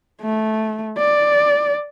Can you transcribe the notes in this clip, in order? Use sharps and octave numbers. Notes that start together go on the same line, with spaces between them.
A3
D5